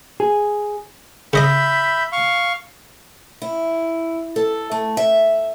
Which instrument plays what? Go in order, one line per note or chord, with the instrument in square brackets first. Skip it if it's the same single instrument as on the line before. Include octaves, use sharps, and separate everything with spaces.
[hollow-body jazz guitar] G#4
[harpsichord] C#3 D#5 D6 [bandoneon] E5 B5 G6
[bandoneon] F5 C#6
[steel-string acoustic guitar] E4
A4
A3
E5